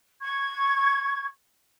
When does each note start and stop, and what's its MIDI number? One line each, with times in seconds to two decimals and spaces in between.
0.21 1.24 85
0.21 1.24 92